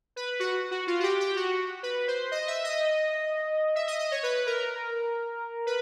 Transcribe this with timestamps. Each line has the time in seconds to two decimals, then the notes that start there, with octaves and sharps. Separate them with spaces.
0.16 B4
0.40 F#4
0.71 F#4
0.87 F4
1.00 F#4
1.03 G4
1.20 G4
1.36 F#4
1.83 B4
2.08 C5
2.31 D#5
2.47 E5
2.64 D#5
3.75 E5
3.87 D#5
3.99 D#5
4.11 C#5
4.23 B4
4.47 A#4
5.66 B4